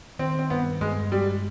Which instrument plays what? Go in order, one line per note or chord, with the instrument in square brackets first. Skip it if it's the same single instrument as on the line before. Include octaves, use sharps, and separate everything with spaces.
[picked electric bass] D#3 [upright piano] C4
[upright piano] C4
[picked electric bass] G2 [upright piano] B3
[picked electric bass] G2 [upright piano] G#3
[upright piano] G3 [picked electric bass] G#3